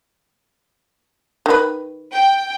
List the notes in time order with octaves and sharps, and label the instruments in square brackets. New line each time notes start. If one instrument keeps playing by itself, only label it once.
[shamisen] D#3 B4
[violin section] G5